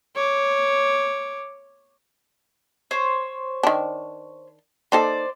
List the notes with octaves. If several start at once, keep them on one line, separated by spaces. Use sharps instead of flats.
C#5 D6
C5 C#5
D#3 D4
A#3 D#4 A4 C5 D5